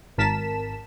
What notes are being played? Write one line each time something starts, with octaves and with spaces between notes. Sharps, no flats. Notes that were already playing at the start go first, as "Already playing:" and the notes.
G#1 A#4 A5 B6 E7